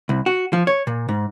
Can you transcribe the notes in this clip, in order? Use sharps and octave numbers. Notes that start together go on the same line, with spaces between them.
C2
F#4
F3
C#5
A#2
G#2